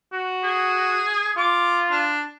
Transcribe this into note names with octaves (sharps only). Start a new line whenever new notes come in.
F#4
G#4
F4 D6
D4